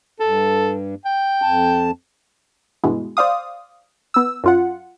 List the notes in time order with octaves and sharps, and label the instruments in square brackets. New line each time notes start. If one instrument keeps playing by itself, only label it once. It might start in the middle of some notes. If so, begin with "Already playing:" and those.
[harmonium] G2 [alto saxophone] A4
[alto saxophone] G5
[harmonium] F2 A5
[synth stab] G2 B2 E3 G#3
C5 D5 F5 D#6
B3 E6
F#2 F4 F#5